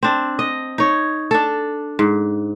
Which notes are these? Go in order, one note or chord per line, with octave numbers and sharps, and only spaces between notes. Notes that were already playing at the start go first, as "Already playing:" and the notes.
C4 D4
D#5
D#4 C#5
D4 A4
G#2